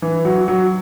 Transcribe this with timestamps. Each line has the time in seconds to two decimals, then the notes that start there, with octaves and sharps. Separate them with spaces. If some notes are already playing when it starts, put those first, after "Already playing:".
0.02 E3
0.25 F#3
0.48 F#3